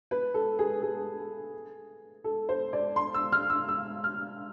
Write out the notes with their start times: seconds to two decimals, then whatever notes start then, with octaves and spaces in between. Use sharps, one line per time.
0.11 B4
0.34 A4
0.59 G#4
0.82 G#4
2.24 A4
2.49 C5
2.73 D5
2.96 C6
3.14 E6
3.32 F6
3.50 E6
3.69 E6
4.04 F6